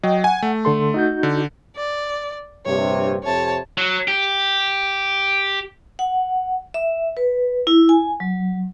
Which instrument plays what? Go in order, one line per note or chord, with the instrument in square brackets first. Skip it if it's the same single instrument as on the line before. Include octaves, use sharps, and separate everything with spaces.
[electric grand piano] F#3 [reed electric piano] D#5 G5
[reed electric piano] F#5 [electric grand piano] G#5
[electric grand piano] A3
[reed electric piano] D3 A4 C6
D#4 F#4 G6
[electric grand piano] D3
[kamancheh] D5
[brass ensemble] A#1 G2 C3 [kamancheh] C#5
[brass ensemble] F2 C3 [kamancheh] C#5 A5
[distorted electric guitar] F#3
G4
[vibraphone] F#5
E5
B4
E4
G#5
F#3